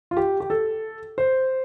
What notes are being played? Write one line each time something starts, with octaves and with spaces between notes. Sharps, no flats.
F4
G4
G4
A4
C5